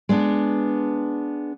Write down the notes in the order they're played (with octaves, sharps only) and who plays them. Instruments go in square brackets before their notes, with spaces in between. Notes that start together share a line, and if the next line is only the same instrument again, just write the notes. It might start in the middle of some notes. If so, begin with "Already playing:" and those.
[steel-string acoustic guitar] G#3 B3 D4